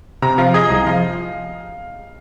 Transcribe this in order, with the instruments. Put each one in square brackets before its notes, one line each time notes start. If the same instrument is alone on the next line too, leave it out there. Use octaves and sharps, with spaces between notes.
[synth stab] C3 [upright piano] A#5
[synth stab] F3 [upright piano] F5
[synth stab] G#4 [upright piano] D#5
[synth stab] C2 [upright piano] D#5
[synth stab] F3 [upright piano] F5